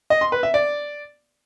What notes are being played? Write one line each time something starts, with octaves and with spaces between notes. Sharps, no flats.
D#5
C6
B4
E5
D5